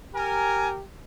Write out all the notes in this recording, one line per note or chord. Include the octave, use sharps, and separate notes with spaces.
G4 A#4 G#5